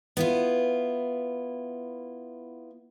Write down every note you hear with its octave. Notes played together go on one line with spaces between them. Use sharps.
B3 E4 F4